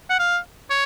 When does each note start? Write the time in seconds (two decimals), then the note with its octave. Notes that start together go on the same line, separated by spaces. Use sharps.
0.10 F#5
0.19 F5
0.70 C#5